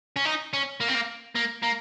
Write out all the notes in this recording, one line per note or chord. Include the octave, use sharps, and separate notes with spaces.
C#4
D#4
C#4
A#3
C4
A#3
A#3
A#3